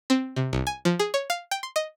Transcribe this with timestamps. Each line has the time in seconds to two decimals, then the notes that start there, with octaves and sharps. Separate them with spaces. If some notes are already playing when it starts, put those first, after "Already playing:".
0.10 C4
0.36 C3
0.53 C2
0.67 G#5
0.85 F3
0.99 G#4
1.14 C#5
1.30 F5
1.51 G5
1.63 C6
1.76 D#5